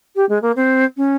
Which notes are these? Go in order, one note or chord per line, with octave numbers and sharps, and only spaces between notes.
G4
G#3
A#3
C4
C#4